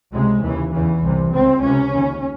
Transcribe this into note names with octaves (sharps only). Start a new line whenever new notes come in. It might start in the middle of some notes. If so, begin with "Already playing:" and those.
C#2 C3 G#3
D#2 C#3 E3
E2 C#3 E3
C2 C3
C#2 C#3 C4
C#2 C3 C#4
D#2 C#3